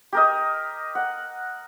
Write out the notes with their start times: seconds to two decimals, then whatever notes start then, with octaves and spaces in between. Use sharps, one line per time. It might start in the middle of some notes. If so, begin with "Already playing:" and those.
0.13 G4 A#4 D#5
0.95 F#5